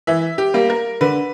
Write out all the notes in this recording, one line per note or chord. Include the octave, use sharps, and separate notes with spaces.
E3 E5
G4
G3 A#3
A#4
D3 B4